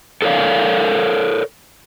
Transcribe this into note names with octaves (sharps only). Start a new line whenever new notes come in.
A4 A#4 C#5 D5 F5